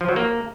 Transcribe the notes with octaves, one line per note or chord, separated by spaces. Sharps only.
F3
F#3
A#3